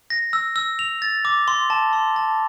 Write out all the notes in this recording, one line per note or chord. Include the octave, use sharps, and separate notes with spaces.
A#6
E6
E6
F7
A6
D6
C6
A5
C6
A5